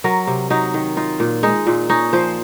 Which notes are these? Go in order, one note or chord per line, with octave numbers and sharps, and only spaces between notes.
F#3 A#4
C3
F#3 D#4
D#3
D#4 F4
A#2
G#3 D#4
A#2
C#4 D#4
F3 C5